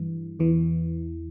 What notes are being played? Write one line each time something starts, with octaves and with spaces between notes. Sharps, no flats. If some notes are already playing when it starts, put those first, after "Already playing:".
Already playing: G2 E3
E2 E3